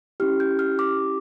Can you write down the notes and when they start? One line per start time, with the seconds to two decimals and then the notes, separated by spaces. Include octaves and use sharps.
0.20 C#4 E4 G4 F6
0.40 G6
0.59 F6
0.79 D6